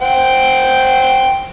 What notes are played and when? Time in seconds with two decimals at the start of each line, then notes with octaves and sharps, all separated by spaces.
0.02 C5 F#5 G5